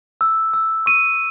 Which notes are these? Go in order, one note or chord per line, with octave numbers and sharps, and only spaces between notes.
E6
E6
C#6 D#7